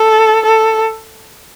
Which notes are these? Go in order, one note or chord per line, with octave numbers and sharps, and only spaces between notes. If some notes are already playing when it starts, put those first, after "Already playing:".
Already playing: A4
A4